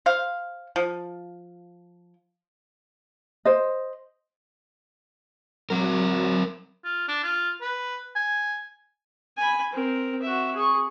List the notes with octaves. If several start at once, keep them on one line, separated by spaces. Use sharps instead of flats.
C5 F5
F3
C5 D#5
F#3 C4 A#4
F4
D4
F4
B4
G#5
G#5 B5
C4 A#4
F#4 E5
G#4 C#6